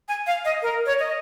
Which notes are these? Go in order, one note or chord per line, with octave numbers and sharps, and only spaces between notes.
G#5
F5
D#5
A#4
C#5
D#5